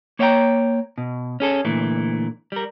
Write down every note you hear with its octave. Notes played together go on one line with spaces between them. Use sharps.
A#3 C#5 E5 F#5 G5 A#5
B2
C#4 G#4 A4
A#2 D3 E3 A3
G3 A#4